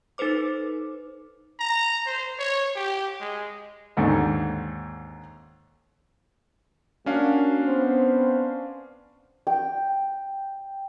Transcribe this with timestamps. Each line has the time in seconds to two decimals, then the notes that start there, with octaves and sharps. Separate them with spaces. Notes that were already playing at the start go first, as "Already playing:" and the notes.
0.18 D#4 A4 B4 C5 D6
1.59 A#5
2.06 C5
2.39 C#5
2.76 G4
3.20 G#3
3.97 D#2 G#2 D3
7.06 A#3 C#4 D4 F#4 F5
7.66 B3 C4 C5
9.47 G5